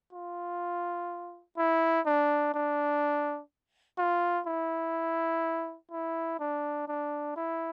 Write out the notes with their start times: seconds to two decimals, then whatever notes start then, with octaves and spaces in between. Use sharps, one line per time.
0.13 F4
1.57 E4
2.06 D4
2.54 D4
3.98 F4
4.47 E4
5.91 E4
6.40 D4
6.88 D4
7.36 E4